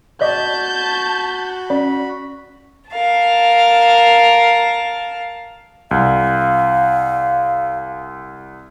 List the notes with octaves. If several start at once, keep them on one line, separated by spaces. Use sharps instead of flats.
F#4 D5 D#5 A5 B5 D6 G6
C#4 D5
A#4 F5 A5
C2 F5